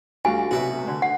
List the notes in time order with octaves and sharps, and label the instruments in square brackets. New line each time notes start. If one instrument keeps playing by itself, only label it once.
[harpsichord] D2 [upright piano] G3 F#4 F5 [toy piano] G#5
[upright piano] B1 C3 [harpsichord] F#4 B4 E5
[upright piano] D3 A3
[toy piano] F#5